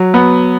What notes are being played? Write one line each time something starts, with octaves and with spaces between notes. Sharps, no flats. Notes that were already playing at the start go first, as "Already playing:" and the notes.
Already playing: F#3
B3